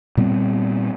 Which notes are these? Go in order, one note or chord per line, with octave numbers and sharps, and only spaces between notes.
A#2 G3 B3 C4